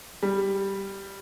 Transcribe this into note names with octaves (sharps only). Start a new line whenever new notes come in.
G3